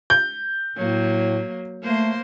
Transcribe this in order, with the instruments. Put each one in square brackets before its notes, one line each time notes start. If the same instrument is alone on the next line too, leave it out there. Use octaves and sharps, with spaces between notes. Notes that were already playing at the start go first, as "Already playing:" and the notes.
[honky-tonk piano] G6
[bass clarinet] A2 [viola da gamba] F#3 A#3
[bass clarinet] A3 [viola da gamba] A#3 C5